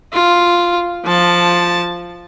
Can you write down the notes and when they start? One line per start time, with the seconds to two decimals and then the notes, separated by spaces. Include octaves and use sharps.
0.13 F4
1.05 F3 A5